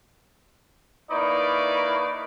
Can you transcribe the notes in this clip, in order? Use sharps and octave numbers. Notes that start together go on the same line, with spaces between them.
A#3 D#4 E4 B4 D5 C#6